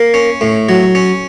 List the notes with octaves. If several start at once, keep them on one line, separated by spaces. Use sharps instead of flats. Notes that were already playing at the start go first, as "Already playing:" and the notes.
Already playing: A#3
C#4
A2
F#3
C#4